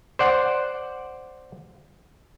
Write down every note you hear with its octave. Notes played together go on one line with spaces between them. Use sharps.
C5 D5 F#5